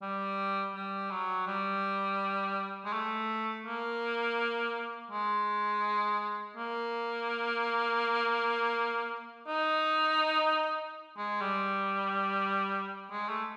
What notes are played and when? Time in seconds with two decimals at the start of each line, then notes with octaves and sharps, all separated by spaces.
0.02 G3
0.75 G3
1.11 F#3
1.47 G3
2.85 G#3
2.93 A3
3.66 A#3
5.11 G#3
6.57 A#3
9.48 D#4
11.17 G#3
11.41 G3
13.11 G#3
13.29 A3